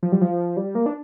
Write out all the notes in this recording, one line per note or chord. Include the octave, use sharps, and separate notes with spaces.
F3
G3
F3
G3
A#3
D4